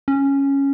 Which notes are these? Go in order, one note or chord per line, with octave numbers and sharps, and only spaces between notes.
C#4